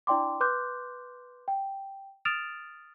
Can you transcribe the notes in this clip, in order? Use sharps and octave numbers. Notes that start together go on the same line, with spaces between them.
D4 E4 D5 G5 C6 D6
B4 C6 D6 F#6 G6
G5
D#6 F6 A6 D7 E7 F7